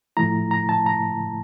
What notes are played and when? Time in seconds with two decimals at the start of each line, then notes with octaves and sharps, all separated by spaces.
0.17 A2 F3 A3 E4 A#5
0.51 A#5
0.69 A5
0.86 A#5